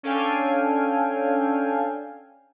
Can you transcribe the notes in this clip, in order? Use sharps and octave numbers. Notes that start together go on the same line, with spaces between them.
C#4 D4 A4 F5 G5 G#5